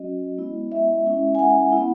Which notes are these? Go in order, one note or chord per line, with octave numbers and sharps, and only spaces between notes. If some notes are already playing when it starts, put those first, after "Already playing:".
Already playing: F#3 C#4 F#4 D#5
G#3 B3 E4
E5
G#3 C#4 E4
G#5
F#5
B3 E4